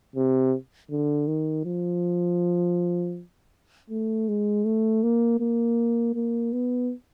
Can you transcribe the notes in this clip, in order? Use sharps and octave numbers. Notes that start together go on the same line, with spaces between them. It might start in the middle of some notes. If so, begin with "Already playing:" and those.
C3
D3
D#3
F3
A3
G#3
A3
A#3
A#3
A#3
B3